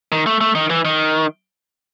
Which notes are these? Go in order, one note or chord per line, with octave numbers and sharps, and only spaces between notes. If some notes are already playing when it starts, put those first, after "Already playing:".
D#3
A3
A3
D#3
E3
D#3